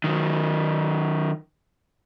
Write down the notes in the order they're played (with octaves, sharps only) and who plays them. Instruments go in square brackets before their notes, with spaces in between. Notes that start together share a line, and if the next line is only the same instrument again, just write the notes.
[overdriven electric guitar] D#3 F#3